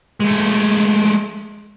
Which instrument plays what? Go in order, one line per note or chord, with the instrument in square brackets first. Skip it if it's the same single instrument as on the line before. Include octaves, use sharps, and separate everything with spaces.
[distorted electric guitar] G#3 A3